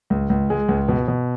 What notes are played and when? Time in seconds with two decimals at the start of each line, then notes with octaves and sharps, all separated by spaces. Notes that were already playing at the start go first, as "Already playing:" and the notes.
0.10 C#2
0.30 C#2
0.50 G#3
0.69 C#2
0.88 B2
1.08 B2